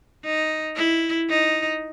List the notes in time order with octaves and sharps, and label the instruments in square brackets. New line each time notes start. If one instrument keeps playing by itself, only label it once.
[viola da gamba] D#4
E4
D#4